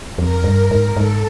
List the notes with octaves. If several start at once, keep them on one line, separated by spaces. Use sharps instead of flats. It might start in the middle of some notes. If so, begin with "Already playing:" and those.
F2 A#4
G2
G#2
G#2 A4